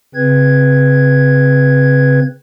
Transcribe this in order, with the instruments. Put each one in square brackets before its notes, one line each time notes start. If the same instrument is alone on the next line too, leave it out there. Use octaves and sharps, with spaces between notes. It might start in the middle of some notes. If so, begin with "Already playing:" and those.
[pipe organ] C#3 C4 B4 G#6